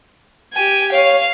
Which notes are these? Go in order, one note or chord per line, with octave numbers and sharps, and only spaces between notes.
G4 G#5
C#5 F5